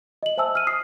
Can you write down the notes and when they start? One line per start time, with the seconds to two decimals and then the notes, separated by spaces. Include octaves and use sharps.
0.23 D#5 F#7
0.37 C5 E5 G#5 A5 E6
0.55 F6 D#7
0.67 D#6 C7